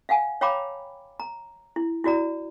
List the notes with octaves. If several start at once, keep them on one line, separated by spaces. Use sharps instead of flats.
F5 F#5 G#5
C#5 F5 G5 A#5 B5 D6
A#5
E4
E4 F#4 D5 A#5